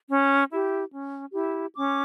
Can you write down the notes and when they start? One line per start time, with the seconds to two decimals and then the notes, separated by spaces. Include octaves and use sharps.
0.09 C#4
0.51 E4 G4
0.91 C#4
1.32 E4 G4
1.74 C#4 D6